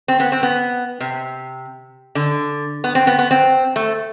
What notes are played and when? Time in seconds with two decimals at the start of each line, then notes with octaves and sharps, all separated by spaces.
0.08 C4
0.20 B3
0.32 C4
0.43 B3
1.00 C3
2.15 D3
2.84 B3
2.95 C4
3.07 B3
3.19 B3
3.31 C4
3.76 A3